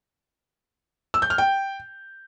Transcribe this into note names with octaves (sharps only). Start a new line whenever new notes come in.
E6
G6
F6
G5